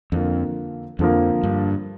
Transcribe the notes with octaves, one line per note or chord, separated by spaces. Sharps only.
F2 D3 F3 A#3
F2 D3 F3 A#3
G2